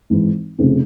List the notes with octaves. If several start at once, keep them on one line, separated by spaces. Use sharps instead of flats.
G#1 G#2 E3
F1 F2 C#3